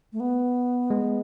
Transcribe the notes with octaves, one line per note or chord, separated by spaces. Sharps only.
A3
B3
G#3